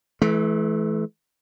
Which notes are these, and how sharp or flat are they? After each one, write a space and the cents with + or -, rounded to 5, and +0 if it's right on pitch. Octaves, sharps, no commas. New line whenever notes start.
E3 +0 A3 -40